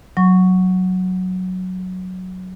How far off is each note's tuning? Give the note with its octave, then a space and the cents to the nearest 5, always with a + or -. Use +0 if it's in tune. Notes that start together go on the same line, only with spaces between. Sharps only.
F#3 +0 C#6 +0